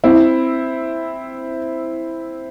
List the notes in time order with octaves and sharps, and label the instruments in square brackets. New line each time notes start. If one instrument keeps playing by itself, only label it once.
[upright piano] C4 E4